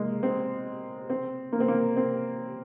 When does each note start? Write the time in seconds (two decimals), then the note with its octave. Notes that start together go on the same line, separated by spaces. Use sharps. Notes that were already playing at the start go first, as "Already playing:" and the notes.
Already playing: G#3 A#3
0.23 C4
1.10 C4
1.53 A#3
1.60 C4
1.68 A#3
1.97 C4